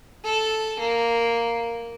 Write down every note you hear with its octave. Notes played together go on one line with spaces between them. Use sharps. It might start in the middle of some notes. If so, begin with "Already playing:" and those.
A4
A#3